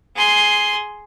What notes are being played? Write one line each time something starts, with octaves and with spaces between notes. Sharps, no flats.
G#4 C6